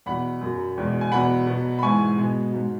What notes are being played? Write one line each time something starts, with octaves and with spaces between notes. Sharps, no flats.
E2 B2 F#3 F#5 B5
F#2 F#3
E2 B2 G#3
G#5
E2 B2 F#3 F#5 B5
B2 F#3
B5
G#2 E3 G#3 G#5 C#6
B2 G#3
G#2 F#3